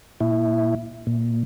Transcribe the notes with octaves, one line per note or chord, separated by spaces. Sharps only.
A#2 E4
A#2